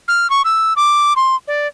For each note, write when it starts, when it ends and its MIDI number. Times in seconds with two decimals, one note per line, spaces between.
0.08 0.30 89
0.30 0.42 85
0.45 0.73 88
0.76 1.13 86
1.16 1.35 84
1.48 1.67 74